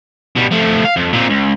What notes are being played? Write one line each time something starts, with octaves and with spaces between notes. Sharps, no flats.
B2 G3
F3 A3
F5
F2
A#2 C4
C#2